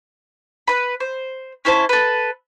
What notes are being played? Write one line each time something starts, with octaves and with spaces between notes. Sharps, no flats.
B4 B5
C5
C#4 E4 C5 A5
A4 B4